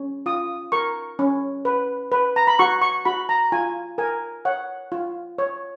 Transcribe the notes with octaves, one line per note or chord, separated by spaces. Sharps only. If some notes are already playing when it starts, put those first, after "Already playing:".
Already playing: C#4
F4 D#6
A#4 C#6
C#4
B4
B4
A#5
B5
F#4 C#6
C#6
F#4 B5
A#5
F4 G#5
A#4 G#5
C#5 F#5
F4
C#5